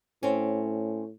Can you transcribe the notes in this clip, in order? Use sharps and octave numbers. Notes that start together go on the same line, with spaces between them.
A2 C4 C#4